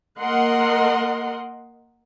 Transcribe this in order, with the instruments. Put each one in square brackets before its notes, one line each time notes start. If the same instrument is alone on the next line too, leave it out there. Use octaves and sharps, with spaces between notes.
[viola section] A#3 A#4 D#5 F#5 C6